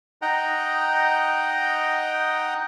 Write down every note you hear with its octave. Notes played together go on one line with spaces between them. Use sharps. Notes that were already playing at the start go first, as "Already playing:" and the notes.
D#4 D#5 F#5 G5 A#5